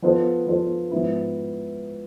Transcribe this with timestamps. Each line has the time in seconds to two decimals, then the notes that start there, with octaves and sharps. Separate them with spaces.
0.02 F3 B3 F4 A4 C5
0.47 F3 B3 F4 A4 C5
0.91 G#2 F3 B3 E4